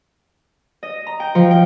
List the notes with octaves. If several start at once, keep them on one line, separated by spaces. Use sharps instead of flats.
D#5
A#5
G5
F3
G5